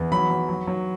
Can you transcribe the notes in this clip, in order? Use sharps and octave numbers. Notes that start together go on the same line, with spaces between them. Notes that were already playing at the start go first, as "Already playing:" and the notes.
Already playing: E2
F#3 B5
F#3
F#3
F#3